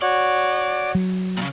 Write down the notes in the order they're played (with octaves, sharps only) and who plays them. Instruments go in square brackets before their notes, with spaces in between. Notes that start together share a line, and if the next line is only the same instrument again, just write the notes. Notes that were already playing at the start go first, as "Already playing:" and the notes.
[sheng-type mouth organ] F#4 C#5 [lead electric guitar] D5
[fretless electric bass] F#3
[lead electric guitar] A#2 C#3